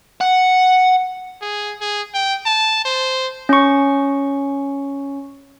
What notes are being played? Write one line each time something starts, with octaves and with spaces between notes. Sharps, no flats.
F#5
G#4
G#4
G5
A5
C5
C#4 C#6